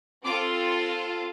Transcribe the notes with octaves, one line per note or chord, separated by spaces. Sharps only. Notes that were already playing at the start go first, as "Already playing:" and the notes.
C4 F4 A4 D6